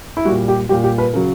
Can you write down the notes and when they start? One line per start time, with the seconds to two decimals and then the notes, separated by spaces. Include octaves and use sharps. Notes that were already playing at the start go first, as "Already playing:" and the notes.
0.17 E4
0.25 G3 F#4
0.28 A#2
0.48 G4
0.69 A#2 G3 G4
0.84 G4
0.98 B4
1.14 C#3 F#3 A#4